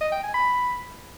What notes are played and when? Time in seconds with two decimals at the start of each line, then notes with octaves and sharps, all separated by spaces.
0.01 D#5
0.12 G5
0.23 G#5
0.34 B5